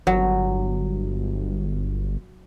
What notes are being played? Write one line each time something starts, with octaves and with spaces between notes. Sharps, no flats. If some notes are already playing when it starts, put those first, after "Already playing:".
G1 F#3